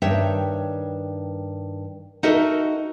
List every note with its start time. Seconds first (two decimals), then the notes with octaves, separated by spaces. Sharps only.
0.02 G2 D#3 C#5 E5
2.23 D#4 F#4 A4 A#4 D#5 E5